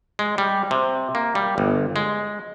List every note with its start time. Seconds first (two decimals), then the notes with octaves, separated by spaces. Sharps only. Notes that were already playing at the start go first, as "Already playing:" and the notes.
0.19 G#3
0.38 G3
0.71 C3
1.15 A#3
1.35 G3
1.58 G1
1.96 G#3